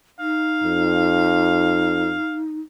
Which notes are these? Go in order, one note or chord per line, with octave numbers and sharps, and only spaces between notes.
D#4 F5
F2